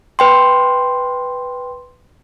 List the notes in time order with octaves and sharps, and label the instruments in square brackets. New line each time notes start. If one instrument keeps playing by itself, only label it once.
[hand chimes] B4 G5 C6